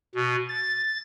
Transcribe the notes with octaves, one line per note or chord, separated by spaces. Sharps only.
B2
A6